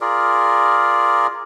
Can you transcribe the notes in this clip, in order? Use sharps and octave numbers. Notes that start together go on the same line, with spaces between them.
F4 G#4 A#4 D5